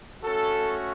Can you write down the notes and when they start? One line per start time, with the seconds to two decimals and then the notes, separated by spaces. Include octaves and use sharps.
0.23 A3 C#4 F#4 A4